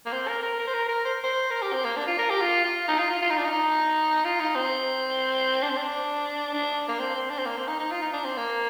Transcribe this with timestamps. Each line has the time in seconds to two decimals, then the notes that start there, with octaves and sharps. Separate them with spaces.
0.06 A#3
0.13 C4
0.28 A#4
0.43 A#4
0.59 A#4
0.67 C5
0.74 A#4
0.89 A#4
1.05 C5
1.24 C5
1.51 A#4
1.62 G4
1.73 C4
1.84 A#3
1.96 D4
2.07 F4
2.18 A#4
2.30 G4
2.41 F4
2.65 F4
2.88 D#4
2.98 F4
3.10 F4
3.22 F4
3.30 D#4
3.38 D4
3.45 D#4
4.25 F4
4.40 D#4
4.55 C4
5.63 D4
5.70 C4
5.77 D4
6.54 D4
6.88 A#3
6.99 C4
7.15 C4
7.30 D4
7.39 C4
7.45 A#3
7.57 C4
7.68 D#4
7.80 D#4
7.91 F4
8.02 D#4
8.13 D4
8.25 C4
8.37 A#3